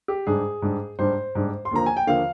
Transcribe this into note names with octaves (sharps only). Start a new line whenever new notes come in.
G4
G#2 G3 D4 G#4
G#2 G3 D4
G#2 G3 D4 C5
G#2 G3 D4
C6
D#2 D3 F3 A#3 A#5
G#5
G5
D#2 D3 F3 A#3 F5